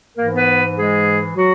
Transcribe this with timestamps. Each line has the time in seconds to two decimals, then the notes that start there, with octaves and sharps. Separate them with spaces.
0.16 G#2 E3 A#3 A#4
0.31 B3 B4
0.76 G#3 G#4
1.36 F#3 F#4